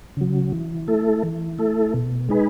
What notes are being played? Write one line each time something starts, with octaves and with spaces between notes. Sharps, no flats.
C#3 F#3
E3
A3 E4 A4
E3
A3 E4 A4
B2
G#3 D#4 G#4 B4